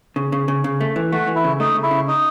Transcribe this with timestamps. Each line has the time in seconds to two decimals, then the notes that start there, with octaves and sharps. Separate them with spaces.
0.16 C#3
0.32 C#3
0.48 C#3
0.64 C#3
0.81 A3
0.96 E3
1.12 A3 F#4
1.27 E3
1.36 E4
1.44 C#3
1.60 A3 D#4
1.75 C#3
1.83 E4
1.91 C#3
2.08 D#4